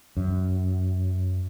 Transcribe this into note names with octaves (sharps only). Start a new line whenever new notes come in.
F#2